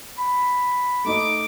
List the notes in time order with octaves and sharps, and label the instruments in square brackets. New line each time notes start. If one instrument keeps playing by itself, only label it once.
[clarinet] B5
[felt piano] A3 D#4 D#5 [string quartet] D6